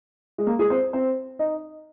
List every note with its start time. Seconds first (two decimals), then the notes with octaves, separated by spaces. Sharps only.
0.38 G#3
0.47 A#3
0.59 G#3 G#4
0.70 C4 C5
0.93 C4 C5
1.39 D#4 D#5